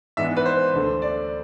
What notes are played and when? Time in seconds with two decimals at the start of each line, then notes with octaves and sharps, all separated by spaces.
0.17 G#2 E3 G#3 B3 D4 E5
0.37 B4
0.46 C5
0.74 D2 D3 A3
1.02 D5